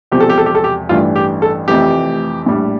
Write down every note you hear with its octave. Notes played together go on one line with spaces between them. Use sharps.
E1 E2 C3 F3 C4 G4
A4
G4
A4
G4
A4
G4
A1 G2 E3 A3 D4 F4
G4
A4
F1 F2 E3 A3 G4
A#1 A2 G3 D4